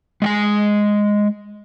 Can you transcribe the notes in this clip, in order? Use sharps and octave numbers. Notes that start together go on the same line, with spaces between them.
G#3 G5 G#5